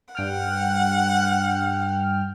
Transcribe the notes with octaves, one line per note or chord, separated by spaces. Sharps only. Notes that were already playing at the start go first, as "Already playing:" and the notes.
G2 F#5 G5 F6